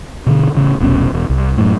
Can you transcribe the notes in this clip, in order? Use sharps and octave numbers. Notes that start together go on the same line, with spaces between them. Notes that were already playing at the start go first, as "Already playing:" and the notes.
B2 D3
A1 C#3
F1 C2 B2 C#4
E1
C2
F#2 A2